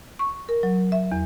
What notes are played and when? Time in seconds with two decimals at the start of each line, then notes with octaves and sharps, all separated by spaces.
0.19 C#6
0.49 A#4
0.63 F#3
0.92 E5
1.12 E2